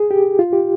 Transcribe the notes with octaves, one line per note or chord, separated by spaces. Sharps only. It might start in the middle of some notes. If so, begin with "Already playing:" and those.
Already playing: G#4
G4
F4
G4